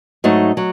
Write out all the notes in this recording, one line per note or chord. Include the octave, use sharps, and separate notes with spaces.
G#2 F#3 A3 D#4 D#5
F#3